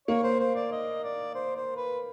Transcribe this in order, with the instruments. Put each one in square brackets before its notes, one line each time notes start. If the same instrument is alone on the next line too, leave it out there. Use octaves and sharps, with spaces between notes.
[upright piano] A#3 [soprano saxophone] C#5
[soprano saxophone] C5
C5
D5
D#5
D5
C5
C5
B4